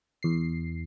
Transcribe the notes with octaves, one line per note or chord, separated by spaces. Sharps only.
E2 C7